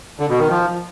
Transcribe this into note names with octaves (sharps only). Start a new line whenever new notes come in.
D3
B2
D#3
F3